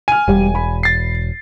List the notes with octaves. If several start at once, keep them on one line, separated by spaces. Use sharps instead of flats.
G#5 F6 D#7
E1 G3
B5
A6 C7